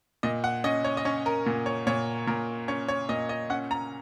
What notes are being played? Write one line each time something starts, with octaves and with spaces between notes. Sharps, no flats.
A#2 D#5
F#5
C#4 D#5
C#5
D#5
C#4 C#5
A#4
A#2
C#5
A#2 C#5
A#2 A#4
C#4 C#5
C#5
A#2 D#5
D#5
C#4 F#5
A#5